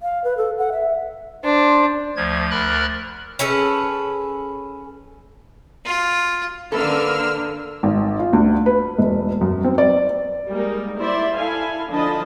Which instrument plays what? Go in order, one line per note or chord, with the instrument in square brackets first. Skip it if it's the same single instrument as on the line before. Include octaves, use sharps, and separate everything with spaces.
[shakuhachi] F5
B4
A4
F#5
E5
[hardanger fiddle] D4 [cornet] C5
[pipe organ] D2 F3 G#6
D2 A#4 B5 F6 F#6 A6
[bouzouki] C#4 G#4 A4 B4
[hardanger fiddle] F4
[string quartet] D3 A#3 [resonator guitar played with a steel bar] A4 B4 [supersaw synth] E6 F6
[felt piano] G#1
F4
D2
B4
E1
F#2
C4
D5
[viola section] G3 G#3 A#3 D#4 A#4
E4 C5 D5 E5
E4 A4 F5 G#5
D3 F3 D4 D#5 A5 B5